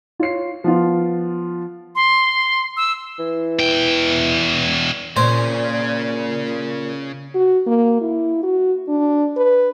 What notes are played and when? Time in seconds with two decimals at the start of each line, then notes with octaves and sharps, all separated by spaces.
0.19 F4 C#5 C7
0.64 F3 B3 F4
1.95 C6
2.77 E6
3.19 E3
3.59 E2 G5
5.17 A#2 C#3 C5 C#5
7.35 F#4
7.67 A#3
8.01 E4
8.43 F#4
8.88 D4
9.37 B4